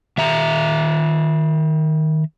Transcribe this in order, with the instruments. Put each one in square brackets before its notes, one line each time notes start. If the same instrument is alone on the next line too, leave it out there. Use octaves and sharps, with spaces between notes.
[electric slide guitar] D#3 E5 A#5